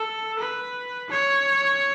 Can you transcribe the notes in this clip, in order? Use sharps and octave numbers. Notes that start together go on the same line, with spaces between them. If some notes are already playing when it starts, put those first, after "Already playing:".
Already playing: A4
B4
C#5